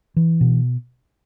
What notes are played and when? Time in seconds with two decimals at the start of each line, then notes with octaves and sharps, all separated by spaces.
0.16 E3
0.41 B2